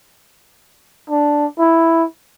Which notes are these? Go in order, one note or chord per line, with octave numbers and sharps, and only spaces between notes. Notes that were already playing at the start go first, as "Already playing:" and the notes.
D4
E4